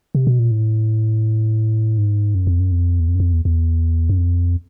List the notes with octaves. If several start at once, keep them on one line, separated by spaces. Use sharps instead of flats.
C3
B2
A#2
A2
G#2
F#2
F2
F#2
F2
E2
F2
F#2
F2
E2
E2
F#2
F2